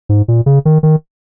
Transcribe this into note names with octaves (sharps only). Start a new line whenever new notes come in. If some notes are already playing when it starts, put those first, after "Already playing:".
G#2
A#2
C#3
D#3
D#3